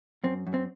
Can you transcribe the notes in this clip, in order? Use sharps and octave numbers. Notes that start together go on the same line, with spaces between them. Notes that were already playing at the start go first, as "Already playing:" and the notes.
F#2 C4
F#2
C4